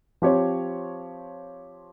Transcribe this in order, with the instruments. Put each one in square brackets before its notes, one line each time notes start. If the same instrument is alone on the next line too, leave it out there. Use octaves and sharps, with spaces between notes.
[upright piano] F3 C4 G4 C#5